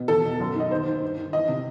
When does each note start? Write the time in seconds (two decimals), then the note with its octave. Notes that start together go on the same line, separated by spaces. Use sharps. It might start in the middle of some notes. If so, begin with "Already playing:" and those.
Already playing: B2
0.08 E2 A4
0.24 B2
0.40 F#2
0.55 D#3
0.60 D#5
0.70 D#2 C5
0.87 D#3
1.02 G2
1.17 D#3
1.33 E3 D#5
1.48 C3